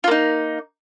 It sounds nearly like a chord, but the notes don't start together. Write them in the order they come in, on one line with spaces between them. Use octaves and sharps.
F4 A#3 D#4